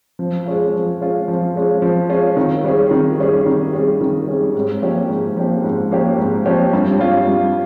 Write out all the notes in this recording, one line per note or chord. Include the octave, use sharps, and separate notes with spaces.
F3
G#3 C#4 F4
F3
G#3 C#4 F4
F3
G#3 C#4 F4
F3
G#3 C#4 F4
D#3
G3 C#4 G#4
D#3
G3 C#4 G#4
D#3
G3 C#4 G#4
D#3
G3 C#4 G#4
G#2
F3 A#3 C#4 G4
G#2
F3 A#3 C#4 G4
G#2
F3 A#3 C#4 G4
G#2
F3 A#3 C#4 G4
G2
G3 C#4 F4
G2